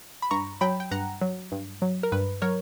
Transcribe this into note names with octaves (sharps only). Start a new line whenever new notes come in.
B5
G2 A#5 C#6
F#3 G5 B5
G5
G2 F#5 A#5
F#3
G2
F#3
A#4
G2 B4
F#3 A#4 C#5